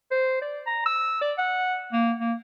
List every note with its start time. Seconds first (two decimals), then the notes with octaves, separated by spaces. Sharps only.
0.11 C5
0.42 D5
0.67 A#5
0.86 E6
1.22 D5
1.38 F#5
1.93 A#3
2.19 A#3